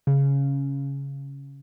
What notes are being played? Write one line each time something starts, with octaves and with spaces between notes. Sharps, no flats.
C#3